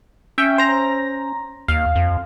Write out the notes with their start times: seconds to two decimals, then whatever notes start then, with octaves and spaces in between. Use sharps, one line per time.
0.38 C#4 E5 G5
0.58 C5 A#5 A#6
1.68 D#2 F5
1.95 F2